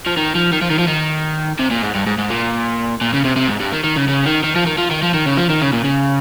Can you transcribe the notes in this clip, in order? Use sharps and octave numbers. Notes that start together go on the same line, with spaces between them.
F3
D#3
F3
D#3
F3
D#3
F3
D#3
C3
A#2
G#2
G2
G#2
G#2
A#2
A#2
C#3
C3
C3
G#2
G2
D#3
D#3
C#3
C#3
D#3
D#3
F3
D#3
F3
D#3
F3
D#3
C#3
F3
D#3
C#3
A#2
C#3